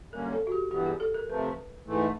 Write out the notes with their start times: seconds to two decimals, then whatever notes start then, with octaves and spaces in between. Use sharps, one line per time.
0.13 F#2 D3 G3 A#3 C#4 A#4
0.33 A4
0.47 F#4
0.52 G4
0.71 G2 E3 G3 B3 G4
0.86 G#4
1.00 A4
1.14 A#4
1.29 C3 F3 A3 B4
1.87 G#2 E3 A3